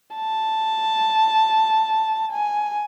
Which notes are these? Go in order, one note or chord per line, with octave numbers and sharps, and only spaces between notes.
A5
G#5